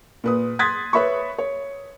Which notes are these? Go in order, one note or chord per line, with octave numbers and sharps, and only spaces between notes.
A#2 B4 D#6
C6 D#6 F#6 G#6 A6 B6
B4 C#5 E5 B5 C#6
C#5